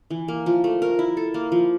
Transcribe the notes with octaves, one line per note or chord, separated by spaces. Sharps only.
E3
A#3
F3
A3
A#4
E4
A4
A#3
F3